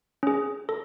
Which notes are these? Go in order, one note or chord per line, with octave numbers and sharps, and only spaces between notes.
C#4 G#4
A4